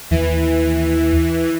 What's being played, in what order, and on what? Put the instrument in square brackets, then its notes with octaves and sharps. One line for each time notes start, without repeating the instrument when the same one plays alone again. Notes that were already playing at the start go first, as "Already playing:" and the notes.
[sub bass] D#2 [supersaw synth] E3